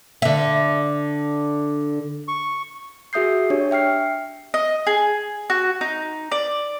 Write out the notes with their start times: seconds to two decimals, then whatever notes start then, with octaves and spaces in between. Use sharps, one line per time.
0.22 D3 E5
2.28 C#6
3.13 F#4 G#4 E5 D#6 G6 C7
3.50 D4 G4 C#5
3.71 E5 G5 F6 C7
4.54 D#5
4.87 G#4
5.50 F#4
5.81 D#4
6.32 D5